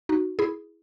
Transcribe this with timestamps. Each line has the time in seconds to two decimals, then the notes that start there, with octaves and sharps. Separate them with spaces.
0.09 D#4 F#4
0.39 E4 G#4